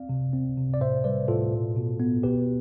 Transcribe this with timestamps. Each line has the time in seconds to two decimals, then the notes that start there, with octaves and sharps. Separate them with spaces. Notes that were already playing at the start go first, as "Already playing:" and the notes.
Already playing: C4 D5 F5
0.09 C3
0.33 C4
0.57 C3
0.74 D5
0.81 A2 C5 E5
1.04 G3 B4 D5
1.28 A2 F4 A4
1.53 B2
1.77 B2
2.00 B3
2.23 B2 G4 B4